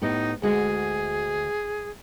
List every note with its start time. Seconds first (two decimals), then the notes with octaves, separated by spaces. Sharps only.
0.02 A2 B3 D#4 G4
0.42 D2 G#3 F#4 G#4